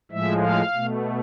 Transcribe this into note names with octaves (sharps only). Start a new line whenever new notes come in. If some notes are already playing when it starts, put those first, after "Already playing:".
A2 F3 G#3 E5
F5
B2 A3